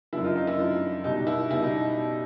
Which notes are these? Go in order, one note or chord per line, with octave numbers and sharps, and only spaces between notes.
F#2 D3 F3 E4
D#4 F4
D#4
E4
F#2 D3 F3
B2 G3 D#4
E4
B2 G3 E4
D#4